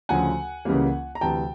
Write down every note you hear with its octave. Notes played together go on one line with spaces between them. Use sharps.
D2 C#3 F3 F#5 G#5
C#2 C#3 E3 G3 A#3
A#5
D2 C3 E3 G5 A5